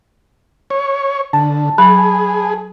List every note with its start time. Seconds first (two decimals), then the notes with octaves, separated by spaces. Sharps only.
0.70 C#5
1.33 D3 A5
1.78 F#3 G#4 B5